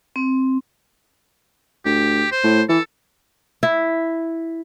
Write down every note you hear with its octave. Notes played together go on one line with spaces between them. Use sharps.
C4
D2 G4
C5
A2
E3 A4
E4